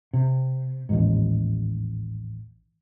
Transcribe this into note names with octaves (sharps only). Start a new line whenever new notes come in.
C3
A1 D#2 G#2